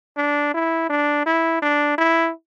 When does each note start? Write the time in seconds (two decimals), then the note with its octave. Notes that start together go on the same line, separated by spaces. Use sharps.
0.17 D4
0.54 E4
0.89 D4
1.26 E4
1.62 D4
1.98 E4